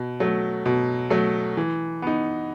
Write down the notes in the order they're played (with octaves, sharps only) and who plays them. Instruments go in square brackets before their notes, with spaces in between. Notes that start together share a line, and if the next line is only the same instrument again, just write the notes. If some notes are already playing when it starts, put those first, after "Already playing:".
Already playing: [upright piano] B2
F#3 A3
B2
F#3 A3
E3
B3 D#4